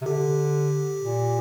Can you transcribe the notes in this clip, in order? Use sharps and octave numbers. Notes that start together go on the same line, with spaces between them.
C3
D3 G4
A#2